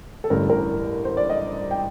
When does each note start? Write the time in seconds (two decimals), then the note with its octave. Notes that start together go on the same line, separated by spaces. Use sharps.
0.24 A4
0.30 A1 G2 D3 A#4
0.50 A#4
1.05 C5
1.17 D5
1.30 D#5
1.71 G5